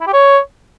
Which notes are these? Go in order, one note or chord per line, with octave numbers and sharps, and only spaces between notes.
E4
G4
C#5